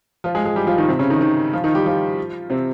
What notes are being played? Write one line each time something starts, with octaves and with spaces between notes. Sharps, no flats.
F3 F4
G#3 G#4
G#3 G#4
G3 G4
F3 F4
D#3 D#4
C3 C4
C#3 C#4
D#3 D#4
D#3 D#4
F3 F4
D#3 D#4
G3 G4
F3 F4
C3 C4